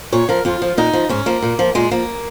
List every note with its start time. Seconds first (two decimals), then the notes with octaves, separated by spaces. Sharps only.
0.12 A#2 C#5
0.29 F3 A#4
0.45 F2 F4
0.62 F3
0.77 A#2 D#4
0.93 F3
1.09 G#2 C#4
1.26 F3 A#3
1.42 A#2
1.59 F3
1.75 A#2 G#3
1.91 F3 A#3